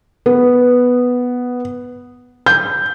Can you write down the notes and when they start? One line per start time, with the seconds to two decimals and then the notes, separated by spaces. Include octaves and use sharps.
0.26 B3
2.46 G6